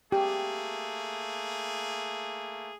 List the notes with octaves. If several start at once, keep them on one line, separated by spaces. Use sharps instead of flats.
A3 A#3 G4 G#4